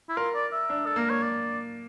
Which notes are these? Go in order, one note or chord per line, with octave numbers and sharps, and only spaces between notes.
E4
F4 A#4
D5
E5
D4
A4
A#3 A#4
C#5
D5